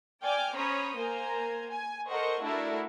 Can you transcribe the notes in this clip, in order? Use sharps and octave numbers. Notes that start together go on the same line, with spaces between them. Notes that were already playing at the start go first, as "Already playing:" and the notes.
D5 G5 G#5 D6 F6
C#4 C5 C#5 A#5 B5 D#6
A#3 A#4 C5 G#5 A#5
G#5
A4 A#4 C5 D#5 F#5 C#6
A3 D4 E4 F#4 A4 A#4